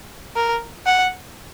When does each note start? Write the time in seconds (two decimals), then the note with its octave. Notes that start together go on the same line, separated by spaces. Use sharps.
0.36 A#4
0.86 F#5